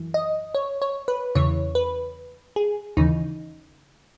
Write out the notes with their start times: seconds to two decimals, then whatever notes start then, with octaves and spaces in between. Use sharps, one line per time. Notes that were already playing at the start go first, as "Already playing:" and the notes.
Already playing: F#2 E3
0.14 D#5
0.55 C#5
0.82 C#5
1.08 B4
1.35 E2 C#3 E3 C#5
1.75 B4
2.56 G#4
2.97 D#2 C#3 E3 D#4